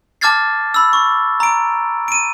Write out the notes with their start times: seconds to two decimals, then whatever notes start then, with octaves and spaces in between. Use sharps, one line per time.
0.21 A5 D6 F6 G#6 A6 C7
0.74 B5 E6
0.93 C#6
1.40 A#5 D7
2.08 D7 D#7